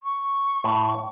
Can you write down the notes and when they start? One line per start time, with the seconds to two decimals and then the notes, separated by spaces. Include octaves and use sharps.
0.03 C#6
0.64 A2